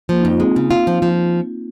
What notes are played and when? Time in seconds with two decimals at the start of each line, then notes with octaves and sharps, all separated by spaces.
0.09 F3 A#3
0.20 D#4
0.25 F2
0.30 F4
0.40 G#3 C4
0.56 C#3
0.71 F4
0.87 F3
1.02 F3